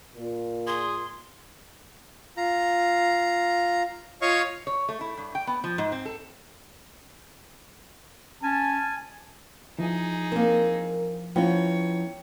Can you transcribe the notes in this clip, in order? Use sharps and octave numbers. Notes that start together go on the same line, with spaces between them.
A#2
G#4 C6
F4 A#5
F4 C#5 D#5 F5 C#6
C#5
A3
E4
G2
G5
B3
F3
G#2
C4
A4
C#4 G#5 A5
E3 F3 D#4 G#4
A#3 C4 A#4
F3 B3 C#4 E4 C#5 G5